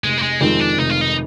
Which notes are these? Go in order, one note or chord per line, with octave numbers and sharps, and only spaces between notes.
F1 G#3
A#3
G#3
F2 D#3 G#3 C4
D4
F1 D#4
F4
D#4